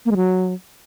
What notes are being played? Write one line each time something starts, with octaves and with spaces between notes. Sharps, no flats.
A#3
G#3
F#3